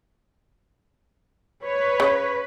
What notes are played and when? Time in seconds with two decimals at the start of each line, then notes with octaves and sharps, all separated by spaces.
1.65 B4 C#5
2.00 C#3